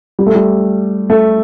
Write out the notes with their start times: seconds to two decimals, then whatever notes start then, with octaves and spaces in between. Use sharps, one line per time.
0.19 G3
0.26 A3
0.35 G3
1.10 A3